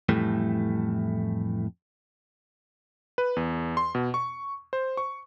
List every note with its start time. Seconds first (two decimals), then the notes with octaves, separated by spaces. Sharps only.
0.09 F2 A2 E3 G3 A3
3.18 B4
3.36 E2
3.77 C6
3.95 B2
4.14 C#6
4.73 C5
4.97 C#6